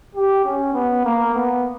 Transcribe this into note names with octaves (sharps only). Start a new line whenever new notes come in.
G4
C#4
B3
A#3
B3